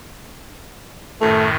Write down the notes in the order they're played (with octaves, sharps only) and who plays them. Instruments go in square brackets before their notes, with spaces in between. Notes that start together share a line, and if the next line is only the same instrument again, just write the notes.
[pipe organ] F#2 A2 D#3 [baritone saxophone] A3